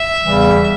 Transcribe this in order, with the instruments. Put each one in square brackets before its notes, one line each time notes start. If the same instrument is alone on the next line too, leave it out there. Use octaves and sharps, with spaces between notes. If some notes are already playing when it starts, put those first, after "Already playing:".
Already playing: [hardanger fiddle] E5
[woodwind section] E2 C#3 E3 G3